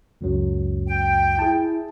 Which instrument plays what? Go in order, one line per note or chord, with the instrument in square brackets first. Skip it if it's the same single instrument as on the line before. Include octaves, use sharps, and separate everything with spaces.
[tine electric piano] C#2 F#2 F#3
[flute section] G5
[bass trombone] E4 [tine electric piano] G#4 A5